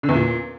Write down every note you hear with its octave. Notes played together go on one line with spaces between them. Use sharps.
D3
E2
A#2